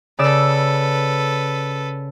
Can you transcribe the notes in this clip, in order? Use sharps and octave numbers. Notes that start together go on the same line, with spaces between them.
C#3 A4 B4 D5 E6